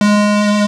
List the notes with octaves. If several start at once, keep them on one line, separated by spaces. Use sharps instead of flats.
G#3